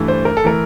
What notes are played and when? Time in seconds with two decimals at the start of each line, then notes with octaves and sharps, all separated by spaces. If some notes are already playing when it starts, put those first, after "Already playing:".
Already playing: G2 E3 A3
0.08 C5
0.25 A#4
0.37 A4
0.44 E3 A3 A#4